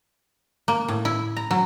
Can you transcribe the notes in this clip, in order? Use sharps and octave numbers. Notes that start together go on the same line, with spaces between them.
A#3
A2
E4
A#5
F#3